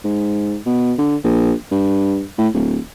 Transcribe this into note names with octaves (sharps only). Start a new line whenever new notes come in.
G#2
B2
D3
A#1
G2
A2
D1